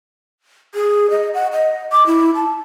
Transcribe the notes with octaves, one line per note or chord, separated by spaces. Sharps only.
G#4
D#5
F#5
D#5
D6
E4
A5